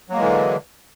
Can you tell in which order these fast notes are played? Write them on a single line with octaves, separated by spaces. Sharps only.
F#3 A#3 G#3 E3 D3